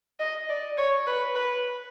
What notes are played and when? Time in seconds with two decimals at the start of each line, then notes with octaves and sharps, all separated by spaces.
0.19 D#5
0.49 D5
0.77 C#5
1.07 B4
1.35 B4